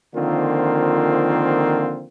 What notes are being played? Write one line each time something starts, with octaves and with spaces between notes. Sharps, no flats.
D3 D#3 F3 A#3 C4 F4